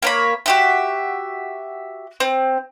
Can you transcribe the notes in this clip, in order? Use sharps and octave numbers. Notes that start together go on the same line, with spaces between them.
A#3 C#5 B5
F#4 G4 E5
C4